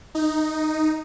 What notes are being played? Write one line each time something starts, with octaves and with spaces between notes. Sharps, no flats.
D#4